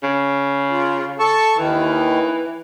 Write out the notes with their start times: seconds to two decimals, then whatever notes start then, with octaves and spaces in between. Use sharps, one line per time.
0.03 C#3
0.71 F4
1.19 A4 A5 C#6
1.58 D#2 D#3 E3